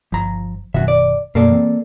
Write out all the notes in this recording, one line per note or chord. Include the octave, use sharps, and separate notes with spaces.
G1 F3 A#5
F#1 F#2 B2 D#3 F#4 E5
D5
F#2 B2 A#3 A4 D5
E3 B3 C4